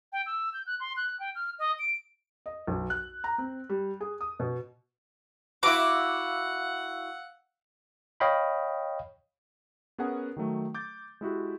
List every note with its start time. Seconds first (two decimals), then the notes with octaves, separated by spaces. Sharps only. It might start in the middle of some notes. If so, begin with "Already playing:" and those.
0.12 G5
0.26 E6
0.54 G6
0.66 F#6
0.80 C6
0.97 F#6
1.20 G5
1.36 F6
1.59 D#5
1.79 D7
2.46 D#5
2.67 B1
2.90 F#6
3.24 A#5
3.38 C4
3.69 G3
4.01 G#4
4.21 D#6
4.40 B2
5.63 E4 F#4 F5 F#5 D6 E6
8.20 C#5 D#5 F5 G5 B5
9.98 B3 C#4 G#4 A#4 F#5 G#5
10.37 D#3 F#3 A3
10.74 D6 G6 A6
11.21 G#3 E4 F#4 G4